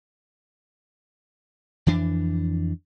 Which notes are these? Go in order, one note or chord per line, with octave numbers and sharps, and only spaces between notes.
F2 E3 D4